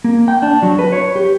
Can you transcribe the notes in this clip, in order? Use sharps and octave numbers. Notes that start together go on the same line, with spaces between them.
A#3
G5
D4
F#3
B4
C#5
G4